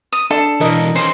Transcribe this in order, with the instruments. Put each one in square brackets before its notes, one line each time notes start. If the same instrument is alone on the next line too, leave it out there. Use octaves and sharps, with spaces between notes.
[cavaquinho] D#6
[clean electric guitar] D4 [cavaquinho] A4
[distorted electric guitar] B2 E3 [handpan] A#4 D#5
[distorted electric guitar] D#3 C#4 [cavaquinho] C5